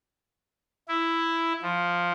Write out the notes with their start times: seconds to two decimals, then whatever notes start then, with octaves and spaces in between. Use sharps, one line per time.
0.88 E4
1.62 F3